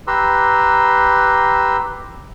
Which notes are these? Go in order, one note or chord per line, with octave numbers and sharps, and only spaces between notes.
G4 B4 A#5 C6 E6